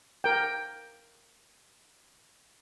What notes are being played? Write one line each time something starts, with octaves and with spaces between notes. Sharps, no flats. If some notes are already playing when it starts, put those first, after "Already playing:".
A#4 G5